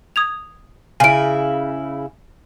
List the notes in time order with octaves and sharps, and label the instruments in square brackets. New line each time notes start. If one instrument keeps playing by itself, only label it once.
[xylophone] D#6 G#6 F7
[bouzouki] C#3 E4 [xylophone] G#5 D7